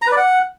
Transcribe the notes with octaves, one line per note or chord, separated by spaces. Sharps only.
A#5
B4
D5
F#5